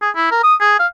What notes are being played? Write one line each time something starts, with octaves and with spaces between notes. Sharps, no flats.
G#4
E4
A#4
D#6
G#4
F5